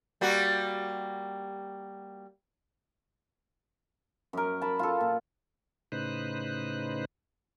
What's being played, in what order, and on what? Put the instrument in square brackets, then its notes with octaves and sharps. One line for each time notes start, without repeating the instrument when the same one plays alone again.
[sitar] G3 A#3 F#4
[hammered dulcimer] F#2 A#4
A5 B5
F4 A4
A#2
[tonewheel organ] A2 C#3 D#4 B4 C5 F#6